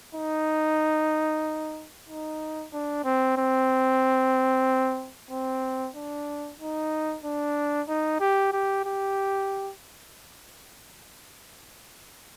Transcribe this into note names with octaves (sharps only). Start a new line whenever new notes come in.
D#4
D#4
D4
C4
C4
C4
D4
D#4
D4
D#4
G4
G4
G4